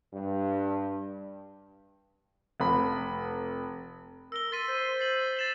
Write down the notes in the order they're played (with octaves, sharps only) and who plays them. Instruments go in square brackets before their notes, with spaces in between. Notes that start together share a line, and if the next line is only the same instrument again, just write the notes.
[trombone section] G2
[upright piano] F1 B5
[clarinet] A#4 [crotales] E6 G7
[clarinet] C6 [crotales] A6 B6 D#7
[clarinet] C5
[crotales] A6 C7 F#7
A6 E7 F#7